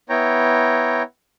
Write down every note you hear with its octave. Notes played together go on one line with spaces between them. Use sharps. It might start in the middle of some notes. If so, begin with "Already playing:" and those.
B3 E4 C#5 G5 A#5